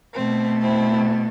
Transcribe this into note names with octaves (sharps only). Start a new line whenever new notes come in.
B2 A3 C4
C4 E4